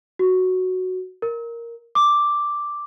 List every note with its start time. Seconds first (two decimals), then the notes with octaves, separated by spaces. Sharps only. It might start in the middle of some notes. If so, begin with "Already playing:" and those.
0.19 F#4
1.22 A#4
1.95 D6